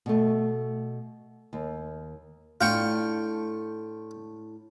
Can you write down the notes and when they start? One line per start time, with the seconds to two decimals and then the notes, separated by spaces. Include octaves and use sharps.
0.06 B2 A3
1.53 D#2
2.61 A2 A3 D4 F4 G5 C#6